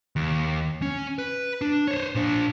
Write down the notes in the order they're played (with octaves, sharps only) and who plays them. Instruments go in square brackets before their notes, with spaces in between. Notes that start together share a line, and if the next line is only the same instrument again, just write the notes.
[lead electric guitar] D#2
C#4
B4
D4
C5 C#5
A#2 D4